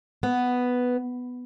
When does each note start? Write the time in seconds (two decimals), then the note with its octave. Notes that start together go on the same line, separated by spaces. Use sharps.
0.23 B3